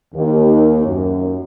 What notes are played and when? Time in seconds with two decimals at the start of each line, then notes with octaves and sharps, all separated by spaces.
0.15 D#2
0.85 F#2